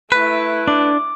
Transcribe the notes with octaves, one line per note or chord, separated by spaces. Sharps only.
A3 E4 B4
D4 D6